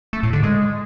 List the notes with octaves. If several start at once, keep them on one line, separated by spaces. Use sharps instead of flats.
A3
A2
D3
G#3